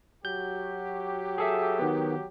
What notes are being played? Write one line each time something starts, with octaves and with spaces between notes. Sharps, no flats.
F#3 F#4 G4 G6
G#4 A4 E5
D#3 B3